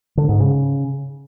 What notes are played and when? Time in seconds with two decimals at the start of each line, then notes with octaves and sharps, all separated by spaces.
0.17 D3
0.29 G#2
0.40 C#3